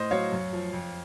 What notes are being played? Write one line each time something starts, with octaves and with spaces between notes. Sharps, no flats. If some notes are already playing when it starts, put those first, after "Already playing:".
Already playing: A2 C5 D#5
F#3 C#5 F5
F#2
F3
F2